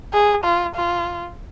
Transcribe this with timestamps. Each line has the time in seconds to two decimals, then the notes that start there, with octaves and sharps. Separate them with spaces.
0.13 G#4
0.44 F4
0.75 F4